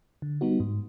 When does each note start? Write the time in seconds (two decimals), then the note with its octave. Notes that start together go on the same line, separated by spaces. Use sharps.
0.22 D3
0.41 G3 B3 D#4 F#4
0.60 G#2